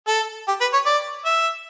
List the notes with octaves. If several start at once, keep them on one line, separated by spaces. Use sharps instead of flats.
A4
G4
B4
C#5
D5
E5